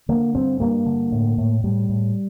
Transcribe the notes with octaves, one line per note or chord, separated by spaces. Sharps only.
D3 A#3
G2 C4
G2 A#3
D3
A2
A2
A2 G3
A2